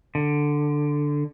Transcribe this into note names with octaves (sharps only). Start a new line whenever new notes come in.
D3